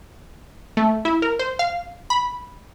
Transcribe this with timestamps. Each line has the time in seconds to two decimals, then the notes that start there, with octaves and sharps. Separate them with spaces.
0.77 A3
1.05 E4
1.22 A#4
1.39 C5
1.59 F5
2.10 B5